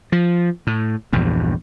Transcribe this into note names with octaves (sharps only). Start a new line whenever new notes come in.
F3
A2
A#1 E2 G2